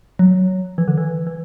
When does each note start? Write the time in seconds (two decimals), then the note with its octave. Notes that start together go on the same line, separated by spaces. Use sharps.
0.19 F#3
0.78 E3
0.88 D3
0.98 E3
1.27 E3